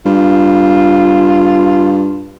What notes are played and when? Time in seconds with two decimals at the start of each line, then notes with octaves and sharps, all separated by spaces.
0.06 G2 F4